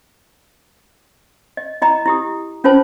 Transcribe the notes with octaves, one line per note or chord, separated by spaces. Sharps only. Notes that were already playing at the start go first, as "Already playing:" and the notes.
D#5
E4 D#5 A#5
E4 G4 D#6
C#4 F4 B4 C5 A5